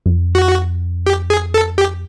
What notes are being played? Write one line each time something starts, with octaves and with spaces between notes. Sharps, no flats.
F#2
F2
F#4
G4
G#4
A4
G4